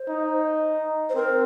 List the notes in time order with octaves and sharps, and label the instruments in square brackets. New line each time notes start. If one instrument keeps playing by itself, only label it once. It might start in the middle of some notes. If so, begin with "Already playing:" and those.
Already playing: [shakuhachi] C5
[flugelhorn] D#4
[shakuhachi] C5
[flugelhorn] C4 [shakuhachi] A#4